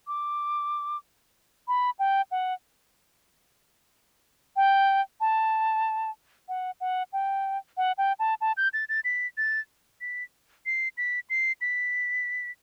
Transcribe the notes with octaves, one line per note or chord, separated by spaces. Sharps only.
D6
B5
G5
F#5
G5
A5
F#5
F#5
G5
F#5
G5
A5
A5
G6
A6
A6
B6
A6
B6
C7
B6
C7
B6